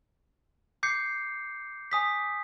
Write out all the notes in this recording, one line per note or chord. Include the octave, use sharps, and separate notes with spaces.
D6 G6 C7 C#7
G#5 D#6 B6